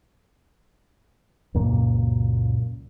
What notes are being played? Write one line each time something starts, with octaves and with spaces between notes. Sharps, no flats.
C#2 F#2 A#2 A#3